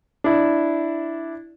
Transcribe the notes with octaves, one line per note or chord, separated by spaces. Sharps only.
D4 E4